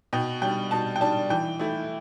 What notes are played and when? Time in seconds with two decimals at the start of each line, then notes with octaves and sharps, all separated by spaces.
0.13 B2 G5
0.42 G3 D4 G5
0.71 B2 A5
0.96 G5
1.01 G3 D4 A5
1.30 E3 G5
1.59 A3 E4